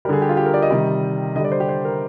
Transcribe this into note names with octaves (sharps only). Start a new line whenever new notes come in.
D3 G3 G#4 A#4
G4
F4
G4
A#4
D5
D#5
C3 D#3 G3
D3 G3 D#5
D5
C5
G4
C5
A#4